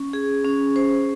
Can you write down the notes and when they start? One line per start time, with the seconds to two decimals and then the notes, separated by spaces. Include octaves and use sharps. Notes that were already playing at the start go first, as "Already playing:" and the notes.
Already playing: C#4
0.13 G#4
0.45 C#4
0.76 C5